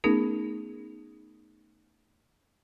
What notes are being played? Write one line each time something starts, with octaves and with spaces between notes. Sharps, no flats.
A3 B3 C#4 D#4 G#4 A#4